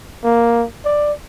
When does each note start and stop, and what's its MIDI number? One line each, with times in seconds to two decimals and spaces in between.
0.24 0.65 58
0.85 1.13 74